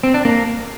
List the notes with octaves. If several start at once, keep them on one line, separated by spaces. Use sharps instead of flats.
C4
D4
A#3